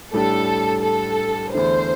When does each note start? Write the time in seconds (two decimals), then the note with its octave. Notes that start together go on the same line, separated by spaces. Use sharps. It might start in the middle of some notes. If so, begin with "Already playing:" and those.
0.13 A2 G3 D4 G4 A4
0.83 A4
1.53 E2 D3 A3 C5